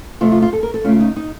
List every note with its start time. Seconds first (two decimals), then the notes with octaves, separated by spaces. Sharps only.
0.21 F2 C3 F3 A3 F4
0.32 F4
0.42 F4
0.53 A4
0.63 A#4
0.74 A4
0.84 C#3 A3 C#4 F4
1.00 D#4
1.16 D#4